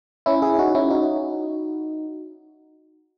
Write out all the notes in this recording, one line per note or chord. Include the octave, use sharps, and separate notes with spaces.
C#4 E4
E4 G#4
D#4 F#4
C#4 E4
D#4 F#4